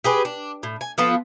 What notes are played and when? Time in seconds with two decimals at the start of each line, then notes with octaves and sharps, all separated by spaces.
0.04 G4 G#4 B4
0.25 D4
0.63 A2
0.81 G#5
0.98 F3 B3 F4 A4